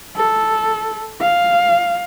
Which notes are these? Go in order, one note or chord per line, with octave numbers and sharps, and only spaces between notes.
A4
F5